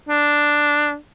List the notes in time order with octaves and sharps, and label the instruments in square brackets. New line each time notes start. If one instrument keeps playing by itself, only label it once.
[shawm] D4